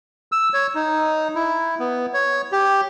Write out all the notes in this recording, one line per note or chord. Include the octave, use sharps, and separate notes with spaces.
E6
C#5
D#4
E4
B3
C#5
G4